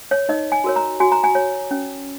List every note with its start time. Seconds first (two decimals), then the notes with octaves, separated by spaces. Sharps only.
0.11 C#5
0.29 D#4 D#5
0.52 G#5
0.64 F#4 A#4 C#5
0.76 A#5
1.00 F#4 G#5
1.12 A#5
1.24 G#5
1.35 C#5
1.71 C#4